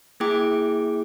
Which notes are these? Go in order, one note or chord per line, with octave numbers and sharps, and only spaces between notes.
A#3 E4 G#4 G5 D6